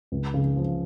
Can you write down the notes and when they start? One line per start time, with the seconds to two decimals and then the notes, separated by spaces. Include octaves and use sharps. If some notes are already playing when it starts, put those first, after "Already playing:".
0.12 C#2
0.34 C#3
0.56 F3